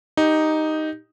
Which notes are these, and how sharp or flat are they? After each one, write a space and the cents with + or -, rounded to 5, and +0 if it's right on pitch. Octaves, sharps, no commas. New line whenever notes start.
D#4 +0 G4 +0